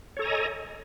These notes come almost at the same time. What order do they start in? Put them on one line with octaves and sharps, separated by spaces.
C#5 A4 A#5 G#5 D#5